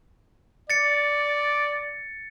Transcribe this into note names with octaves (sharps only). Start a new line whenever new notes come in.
D5 A6 C#7